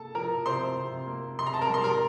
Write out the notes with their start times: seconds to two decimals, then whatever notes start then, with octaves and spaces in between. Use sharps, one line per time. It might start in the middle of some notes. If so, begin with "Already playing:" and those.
Already playing: C3 A#3 A4 A5
0.15 F3 A#4 A#5
0.46 C3 C5 C6
0.77 C3
1.07 A#3
1.39 C3 C6
1.47 A#5
1.54 A5
1.61 A#4 A#5
1.69 G3 C6
1.84 A#4 A#5